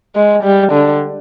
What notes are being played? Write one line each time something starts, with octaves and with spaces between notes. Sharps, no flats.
G#3
G3
D3